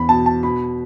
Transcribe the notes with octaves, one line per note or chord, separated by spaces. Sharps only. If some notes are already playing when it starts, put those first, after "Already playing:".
Already playing: E2 B5
B2 A5
A5
B2 B5